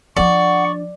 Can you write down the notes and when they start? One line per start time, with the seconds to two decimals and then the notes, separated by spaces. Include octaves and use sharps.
0.17 F3 D4 D5 F#5 C#6